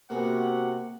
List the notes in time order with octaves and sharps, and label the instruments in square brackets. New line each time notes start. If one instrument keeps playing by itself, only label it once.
[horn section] C3 F#4 F#5 [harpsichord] A#3 B3 G#4